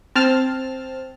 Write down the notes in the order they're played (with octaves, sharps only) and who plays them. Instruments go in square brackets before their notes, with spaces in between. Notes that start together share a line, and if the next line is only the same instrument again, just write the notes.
[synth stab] C4 A5 F6